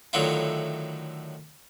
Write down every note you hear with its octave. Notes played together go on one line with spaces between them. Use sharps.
A2 D3 D#3 F#3 E4 F4